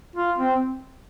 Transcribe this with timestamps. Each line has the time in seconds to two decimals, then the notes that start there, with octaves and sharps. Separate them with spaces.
0.16 F4
0.38 C4